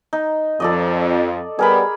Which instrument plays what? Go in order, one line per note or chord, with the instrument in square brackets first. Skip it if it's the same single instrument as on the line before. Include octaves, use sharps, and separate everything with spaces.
[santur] D#4
[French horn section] F2 [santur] A4 D5 D#5
[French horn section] G3 B3 [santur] G#4 A#4 B5